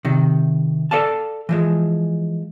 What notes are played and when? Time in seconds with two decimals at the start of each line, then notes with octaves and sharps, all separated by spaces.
0.05 C3 D#3
0.91 A4 D5 F5 A5
1.49 E3 F3 G#3